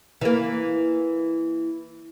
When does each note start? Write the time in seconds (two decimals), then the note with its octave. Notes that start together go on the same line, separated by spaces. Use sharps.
0.21 E3 A#3